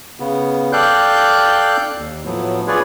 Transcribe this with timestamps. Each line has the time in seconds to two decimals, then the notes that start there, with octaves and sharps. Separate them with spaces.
0.20 C#3 B3
0.72 A4 D5 F5 G5 F#6 G6
1.97 D#2
2.25 A2 F3 F#3 B3
2.67 F4 G#4 B4 C#5 D5